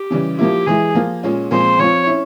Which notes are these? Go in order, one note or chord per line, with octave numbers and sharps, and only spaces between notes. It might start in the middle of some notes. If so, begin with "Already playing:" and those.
Already playing: G4
C#3 E3 G3
F3 A#3 E4 G4
E3 G#3 E4 G#4
F3 A#3 F4
A#2 G#3 C#4 F4
A#2 F3 G#3 C4 C5
F3 C4 F4 C#5
C#4 E4